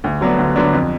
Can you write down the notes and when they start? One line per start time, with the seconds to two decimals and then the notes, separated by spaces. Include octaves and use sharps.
0.04 D2
0.21 D3 F#3 B3 D4
0.38 D2
0.56 D3 F#3 B3 D4
0.73 F2